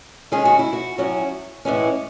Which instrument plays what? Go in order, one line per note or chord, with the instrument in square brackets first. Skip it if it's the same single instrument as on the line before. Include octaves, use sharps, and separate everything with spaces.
[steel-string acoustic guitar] D#3 G#3 C#4 G#4
F#4
E4
F#4
A2 F#3 C#4 F#4
A2 E3 G#3 C#4